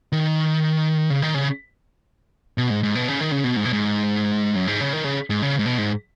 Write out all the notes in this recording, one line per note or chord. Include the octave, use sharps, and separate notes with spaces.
D#3
C#3
D#3
C#3
B2
G#2
G#2
B2
C#3
D#3
C#3
B2
G#2
B2
G#2
F#2
G#2
C#3
D#3
C#3
G#2
C#3
G#2
B2
G#2